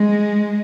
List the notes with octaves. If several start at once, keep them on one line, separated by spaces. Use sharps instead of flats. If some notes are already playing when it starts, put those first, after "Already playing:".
Already playing: G#3